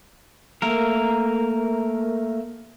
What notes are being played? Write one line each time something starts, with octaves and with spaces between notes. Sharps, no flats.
A3 A#3 A#4